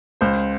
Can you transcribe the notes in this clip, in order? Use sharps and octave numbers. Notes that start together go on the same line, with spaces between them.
C#2 C5